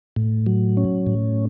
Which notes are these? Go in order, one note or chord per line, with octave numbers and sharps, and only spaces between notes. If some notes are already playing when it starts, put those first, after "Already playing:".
A2
F#3
C#4
A2